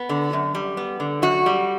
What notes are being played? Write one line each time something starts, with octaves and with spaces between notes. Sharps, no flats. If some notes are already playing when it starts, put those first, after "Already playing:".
Already playing: B3
D3
F#2
G3
B3
D3
F#2 F#4
G3